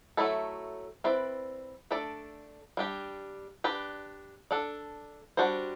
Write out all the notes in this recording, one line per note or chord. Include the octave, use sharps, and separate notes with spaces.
F#3 A3 E4 A4
C4 E4 B4 D5
A3 D4 A4 D5
G3 D4 G4
D4 G4 B4 D5
D4 A4 D5
G3 D4 F#4 C5